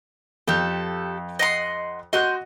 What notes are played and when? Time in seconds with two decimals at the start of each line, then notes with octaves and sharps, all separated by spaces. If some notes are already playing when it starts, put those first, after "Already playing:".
0.48 F2 G4 A4
1.39 D#5 F#5 C6
2.13 F#4 D#5 C6 F#6 G6